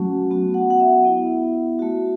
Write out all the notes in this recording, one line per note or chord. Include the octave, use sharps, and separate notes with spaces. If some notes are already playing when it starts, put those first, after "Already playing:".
Already playing: F#3 A3 C#4 F#4
B3 F#4
F#5
F#5
E5
B3 E4
A3 F#4